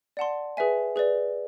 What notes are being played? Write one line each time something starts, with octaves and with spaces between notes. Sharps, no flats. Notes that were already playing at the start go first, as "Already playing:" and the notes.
D5 F#5 A5 C6
G#4 B4 E5 G#5
G#4 B4 D5